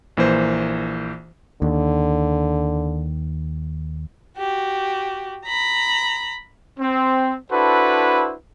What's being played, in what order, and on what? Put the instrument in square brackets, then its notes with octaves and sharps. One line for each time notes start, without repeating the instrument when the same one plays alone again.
[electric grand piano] A#1 E3 A#3 C5
[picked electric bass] D#2 [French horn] D3
[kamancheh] F#4 G4
A#5 B5
[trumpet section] C4
D4 E4 F#4 A4 B4 C5